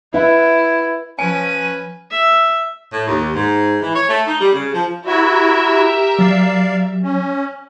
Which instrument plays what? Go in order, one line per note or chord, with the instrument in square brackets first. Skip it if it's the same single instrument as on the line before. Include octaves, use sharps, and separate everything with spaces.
[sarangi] E4 [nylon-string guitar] B4 E5 F#5
[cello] F3 [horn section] C#4 B4 [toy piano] G#5 [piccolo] D#7
[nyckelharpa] E5
[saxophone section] A2
D#2
G#2
E3
C#5
A3
D#4
G3
C#3
F3
[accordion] E4 F#4 [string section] G4 A#4 E5
[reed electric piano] F#3 [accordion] D5 F5
[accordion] C#4